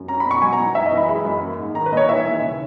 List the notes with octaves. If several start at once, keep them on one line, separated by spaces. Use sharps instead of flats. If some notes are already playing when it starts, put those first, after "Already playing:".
Already playing: F#2
C#4 A#5
B5
B2
C#6
F#3 G#5
A#5
E2
F#2 E5
D#5
E3
B5
G#3 B5
F#2
A#3
G#2
D#3 A#5
B4
A#1 D#5
C#5
E3 E5
D#2
C#3